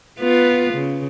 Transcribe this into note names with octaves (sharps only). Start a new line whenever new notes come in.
B3 F4 B4
C#3